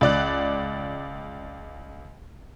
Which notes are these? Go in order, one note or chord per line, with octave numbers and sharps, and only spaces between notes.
C#2 D5 F#6